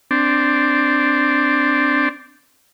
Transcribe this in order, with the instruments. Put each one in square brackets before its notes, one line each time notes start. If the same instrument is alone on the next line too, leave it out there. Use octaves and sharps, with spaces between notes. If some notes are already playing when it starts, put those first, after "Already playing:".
[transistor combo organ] C4 D4